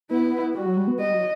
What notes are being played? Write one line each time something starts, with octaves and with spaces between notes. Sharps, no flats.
B3 E4
G3 F#4
F#3
G3
B3
G3 D#5
F#3